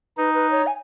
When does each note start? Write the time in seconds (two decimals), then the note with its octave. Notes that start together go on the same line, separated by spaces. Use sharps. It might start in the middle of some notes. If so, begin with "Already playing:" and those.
0.17 D#4 B4
0.34 B4
0.51 C#5
0.67 G#5